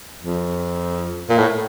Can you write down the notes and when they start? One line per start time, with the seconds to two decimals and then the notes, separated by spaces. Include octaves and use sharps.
0.22 F2
1.29 A#2
1.38 A2